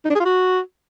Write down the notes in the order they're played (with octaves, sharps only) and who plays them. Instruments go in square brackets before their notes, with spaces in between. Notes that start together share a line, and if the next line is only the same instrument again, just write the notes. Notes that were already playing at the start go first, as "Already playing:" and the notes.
[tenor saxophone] D#4
D4
G#4
F4
F#4